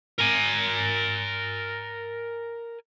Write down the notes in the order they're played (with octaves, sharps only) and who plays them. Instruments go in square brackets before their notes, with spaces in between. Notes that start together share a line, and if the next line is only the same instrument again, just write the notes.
[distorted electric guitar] A#4 G#5